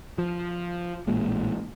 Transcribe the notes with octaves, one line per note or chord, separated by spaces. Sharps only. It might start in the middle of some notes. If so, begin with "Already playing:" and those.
F3
A1 A#2 G#3